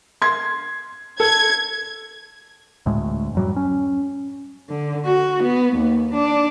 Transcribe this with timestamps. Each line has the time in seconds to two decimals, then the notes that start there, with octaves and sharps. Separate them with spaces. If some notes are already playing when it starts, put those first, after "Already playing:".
0.22 C6 G#6
1.20 A4 G#6
2.86 D2 A2 G#3
3.35 F#2 F#3 G3
3.56 C#4
4.69 D3
5.05 F#4
5.43 B3
5.75 D#2
6.14 D4